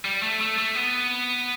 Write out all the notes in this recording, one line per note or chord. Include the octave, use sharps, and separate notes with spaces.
G3
A3
A3
A3
B3